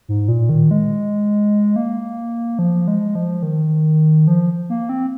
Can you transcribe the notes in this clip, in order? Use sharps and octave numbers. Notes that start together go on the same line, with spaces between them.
G#2
A#2
D#3
G#3
A#3
F3
G#3
F3
D#3
F3
A#3
C4